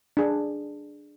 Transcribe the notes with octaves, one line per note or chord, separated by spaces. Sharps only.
D4 G#4